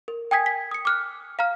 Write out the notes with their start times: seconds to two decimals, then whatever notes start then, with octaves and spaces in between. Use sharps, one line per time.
0.08 A#4
0.31 G5 G#5 D#6 G#6 B6
0.46 B6
0.71 D#6 C#7
0.85 D6 F6 F#6
1.39 F5 A#5 F6